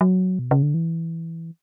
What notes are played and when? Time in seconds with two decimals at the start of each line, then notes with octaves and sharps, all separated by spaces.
0.01 F#3
0.39 B2
0.51 C#3
0.63 D3
0.74 E3